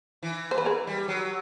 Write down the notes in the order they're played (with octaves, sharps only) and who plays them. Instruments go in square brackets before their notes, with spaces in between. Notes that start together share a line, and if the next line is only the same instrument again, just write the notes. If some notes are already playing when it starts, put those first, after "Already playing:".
[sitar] E3
[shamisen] C5
B4
G#4 A#4
[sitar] G3
F#3